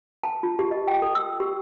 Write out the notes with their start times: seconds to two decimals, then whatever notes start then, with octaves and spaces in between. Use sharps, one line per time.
0.24 A5
0.43 F4
0.59 G4
0.71 D#5
0.87 G5
1.02 A4
1.15 E6
1.40 G4